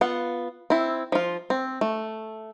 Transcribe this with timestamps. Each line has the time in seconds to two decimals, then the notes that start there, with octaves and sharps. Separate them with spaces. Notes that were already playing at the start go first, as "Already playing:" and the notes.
0.01 B3 F4 F#5
0.70 C4 E4
1.12 F3 F4
1.50 C4
1.81 A3